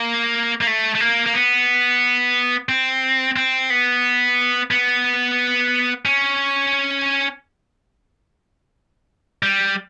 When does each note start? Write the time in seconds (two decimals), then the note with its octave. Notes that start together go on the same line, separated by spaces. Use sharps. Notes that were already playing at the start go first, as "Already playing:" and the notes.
Already playing: A#3
0.61 A#3
0.67 A3
0.95 A3
1.00 A#3
1.26 A#3
1.34 B3
2.69 C4
3.36 C4
3.70 B3
4.71 B3
6.05 C#4
9.43 G3